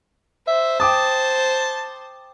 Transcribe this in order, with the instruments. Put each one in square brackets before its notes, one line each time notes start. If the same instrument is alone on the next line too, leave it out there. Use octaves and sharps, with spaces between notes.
[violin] C5 [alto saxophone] E5
[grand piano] G5 D6 D#6 [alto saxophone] A5